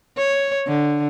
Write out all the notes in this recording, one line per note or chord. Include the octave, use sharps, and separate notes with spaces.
C#5
D3